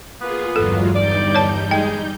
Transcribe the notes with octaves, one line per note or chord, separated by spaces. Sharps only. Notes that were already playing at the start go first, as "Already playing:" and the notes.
A#3 B3 F4 G#4 B4
G1 E2 G2 F#3 G#3 F4 A4
G3 D#4 D5 G6
C#5 A5
G#3 G5